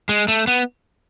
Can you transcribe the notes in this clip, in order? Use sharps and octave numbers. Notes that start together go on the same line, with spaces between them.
G#3
A3
B3